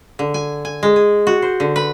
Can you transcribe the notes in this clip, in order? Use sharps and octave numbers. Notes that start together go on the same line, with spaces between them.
D3
G#5
G#5
G#3
G#4
F#4
C5
D3
B4